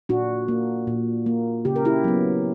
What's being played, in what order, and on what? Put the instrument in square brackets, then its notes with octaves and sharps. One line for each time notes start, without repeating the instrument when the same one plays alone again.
[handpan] A#2 D4 F#4
A#3
A#2
A#3
C#3 G4
A#4
E4 G4
F#3 B3